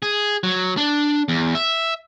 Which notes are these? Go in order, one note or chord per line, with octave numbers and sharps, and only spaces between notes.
G#4
F#3
D4
E2
E5